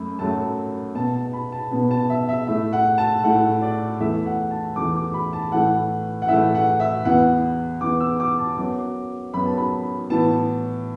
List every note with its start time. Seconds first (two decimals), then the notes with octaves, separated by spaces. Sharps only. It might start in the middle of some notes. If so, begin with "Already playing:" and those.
Already playing: F#2 A3 B5
0.19 F#2 F#3 A3 A5
0.95 B2 B3 A5
1.14 A5
1.33 B5
1.52 A5
1.71 B2 B3
1.91 A5
2.10 E5
2.29 E5
2.47 A2 A3 E5
2.73 F#5
2.98 A5
3.24 A2 A3 F#5
3.62 D5
4.00 E2 E3 A3 E5
4.26 F#5
4.51 A5
4.76 E2 E3 A3 D6
4.96 D6
5.14 B5
5.33 A5
5.52 A2 E3 A3 F#5
6.22 F#5
6.28 A2 E3 A3 E5
6.55 F#5
6.80 E5
7.05 E2 E3 B3 F#5
7.81 E2 E3 B3 D6
8.00 E6
8.20 D6
8.39 A5
8.57 F#2 F#3 B3 D6
9.33 F#2 F#3 B3 B5
9.46 A5
9.57 B5
10.10 A2 E3 B3 A5